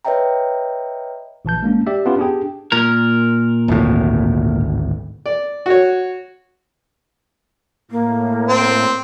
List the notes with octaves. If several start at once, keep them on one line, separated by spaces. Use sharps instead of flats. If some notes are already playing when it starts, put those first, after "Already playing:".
B4 C#5 D#5 E5 G5 A#5
A#1 E3 A5 G6
G#3 A#3 C#4 D4
G4 D5 E5
B3 C#4 F4 G4 B4
D4 G4 G#4 G5
A#2 A#4
G#1 D2 A2
D5
F#4 C#5
A2 A#3
C4